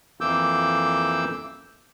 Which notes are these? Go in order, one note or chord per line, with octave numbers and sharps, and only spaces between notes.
F2 E3 A#3 D6 E6 G6